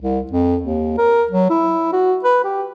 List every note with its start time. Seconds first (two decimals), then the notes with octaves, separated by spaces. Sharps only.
0.01 C2
0.31 F2
0.63 D#2
0.98 A#4
1.31 F#3
1.50 E4
1.93 F#4
2.24 B4
2.44 G4